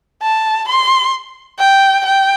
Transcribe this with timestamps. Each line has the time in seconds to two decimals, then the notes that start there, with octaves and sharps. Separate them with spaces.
0.22 A5
0.68 C6
1.59 G5
2.06 G5